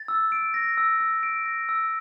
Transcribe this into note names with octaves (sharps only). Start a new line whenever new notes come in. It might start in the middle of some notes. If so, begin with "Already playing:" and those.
Already playing: A6
E6
D7
A#6
E6
E6
D7
A#6
E6